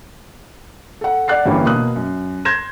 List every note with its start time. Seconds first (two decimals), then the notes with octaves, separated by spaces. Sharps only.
1.01 A4 F#5
1.28 D5 F#5 F#6 A6 C7
1.46 G1 G2 E3 G3 A#3 C#4
1.65 B2 A#3 D#6 F#6
1.96 F#2
2.45 C6 G6 G#6 A#6 E7